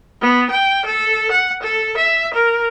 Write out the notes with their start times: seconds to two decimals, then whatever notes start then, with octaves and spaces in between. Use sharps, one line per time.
0.21 B3
0.51 G5
0.86 A4
1.32 F#5
1.63 A4
1.97 E5
2.34 A#4